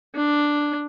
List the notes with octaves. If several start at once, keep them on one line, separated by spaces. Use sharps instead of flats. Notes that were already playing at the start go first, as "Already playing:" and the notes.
D4